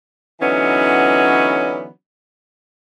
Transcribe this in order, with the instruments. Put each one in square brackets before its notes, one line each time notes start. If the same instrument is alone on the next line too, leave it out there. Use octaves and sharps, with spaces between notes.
[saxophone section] D3 E3 F#3 B3 C#4 D#4